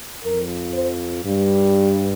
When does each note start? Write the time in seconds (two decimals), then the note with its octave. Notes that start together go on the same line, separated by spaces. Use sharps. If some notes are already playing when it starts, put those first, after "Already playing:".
0.24 F2 F3 A#4
0.73 C5
1.24 G2 G3